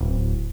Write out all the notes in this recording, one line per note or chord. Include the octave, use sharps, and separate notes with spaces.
D1